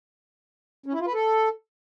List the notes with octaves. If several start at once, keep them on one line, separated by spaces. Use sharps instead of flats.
C#4
E4
F4
B4
A4